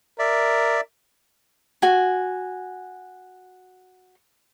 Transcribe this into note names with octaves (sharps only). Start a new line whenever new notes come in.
A#4 D5 E5
F#4 G#5